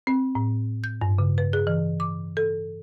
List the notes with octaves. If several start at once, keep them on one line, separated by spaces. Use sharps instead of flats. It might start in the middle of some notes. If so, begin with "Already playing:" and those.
C4
A2
G6
G2
C#3
B4
G#4
E3
D6
A4